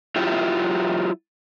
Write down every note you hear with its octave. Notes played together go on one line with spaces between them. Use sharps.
F#3 E4 F4 G4 E5 G5